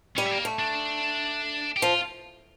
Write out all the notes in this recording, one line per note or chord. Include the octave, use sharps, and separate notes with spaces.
G3 C#4
A3
A#3
A3
D4
G4
F3 F4